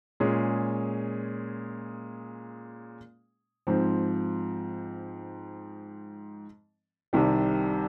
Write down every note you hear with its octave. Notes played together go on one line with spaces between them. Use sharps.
A#2 G#3 C#4 G#4
G#2 F3 C4
C2 C3 D#3 G3